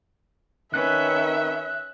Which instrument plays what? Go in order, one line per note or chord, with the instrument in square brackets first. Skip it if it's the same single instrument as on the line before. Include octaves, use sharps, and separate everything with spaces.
[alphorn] D#3 [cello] C#4 B4 [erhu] E5 [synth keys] F#6